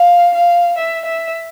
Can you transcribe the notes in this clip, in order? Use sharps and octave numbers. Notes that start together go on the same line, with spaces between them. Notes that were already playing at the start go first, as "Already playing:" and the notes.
Already playing: F5
F5
E5
E5